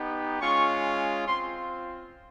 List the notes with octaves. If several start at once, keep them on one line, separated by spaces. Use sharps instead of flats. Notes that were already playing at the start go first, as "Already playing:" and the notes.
Already playing: B3 D#4 G4
G#3 C#4 F4 C#6
C4 F4 C6